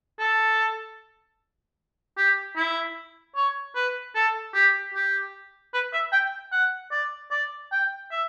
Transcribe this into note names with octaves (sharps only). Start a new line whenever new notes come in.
A4
G4
E4
C#5
B4
A4
G4
G4
B4
E5
G5
F#5
D5
D5
G5
E5